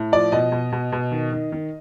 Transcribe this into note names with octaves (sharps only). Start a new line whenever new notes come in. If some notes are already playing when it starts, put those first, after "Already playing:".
Already playing: A2
F3 D5
B2 D#5
B2
B2
B2
D#3
D#3
D#3